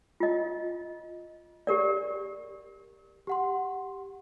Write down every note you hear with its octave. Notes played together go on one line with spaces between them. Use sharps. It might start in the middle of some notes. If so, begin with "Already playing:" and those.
F4 D#5
G4 A#4 D5
G4 F#5 C6